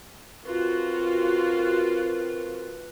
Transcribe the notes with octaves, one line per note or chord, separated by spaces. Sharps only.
C4 F4 F#4 A#4 B4